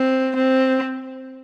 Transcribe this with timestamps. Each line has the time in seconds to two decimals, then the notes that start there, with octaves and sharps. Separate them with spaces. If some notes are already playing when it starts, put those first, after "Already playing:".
Already playing: C4
0.36 C4